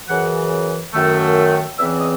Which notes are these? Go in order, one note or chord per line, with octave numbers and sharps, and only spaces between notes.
F#2 C#3 E3 F#5
F#2 D#3 A3
E2 C#3 E3 C4 E5
D#5